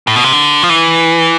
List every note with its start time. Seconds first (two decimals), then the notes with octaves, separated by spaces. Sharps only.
0.07 A2
0.16 B2
0.24 C3
0.33 D3
0.63 F3
0.69 E3